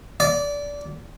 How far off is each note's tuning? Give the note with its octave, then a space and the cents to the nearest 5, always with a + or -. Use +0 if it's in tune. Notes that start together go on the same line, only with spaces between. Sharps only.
D5 -20